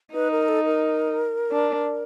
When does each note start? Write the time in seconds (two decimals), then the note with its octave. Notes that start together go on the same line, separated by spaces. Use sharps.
0.14 D#4 B4
0.31 A#4
0.49 A4
0.65 A#4
1.51 D4